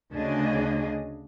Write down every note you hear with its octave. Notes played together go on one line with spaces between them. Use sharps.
D2 C#3 D4 G#4 D#5